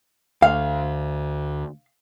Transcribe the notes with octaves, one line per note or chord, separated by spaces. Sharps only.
D2 F5